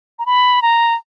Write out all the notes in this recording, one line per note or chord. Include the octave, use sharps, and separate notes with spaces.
A#5
B5
A#5